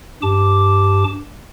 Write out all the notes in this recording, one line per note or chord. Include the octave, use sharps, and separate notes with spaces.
G2 G4 A5 D6